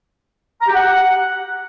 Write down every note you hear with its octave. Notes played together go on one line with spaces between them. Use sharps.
A#5
G4
F#5